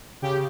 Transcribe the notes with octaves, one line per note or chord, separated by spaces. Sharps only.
C#3 G4